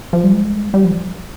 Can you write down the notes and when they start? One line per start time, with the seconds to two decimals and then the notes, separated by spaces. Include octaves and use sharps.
0.13 F3
0.24 G3
0.33 G#3
0.74 G3
0.84 F3